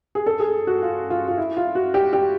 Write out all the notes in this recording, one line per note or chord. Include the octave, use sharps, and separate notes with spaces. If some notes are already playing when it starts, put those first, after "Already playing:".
G#4
A4
G#4
F#4
F4
F4
F4
E4
F4
F#4
G4
G4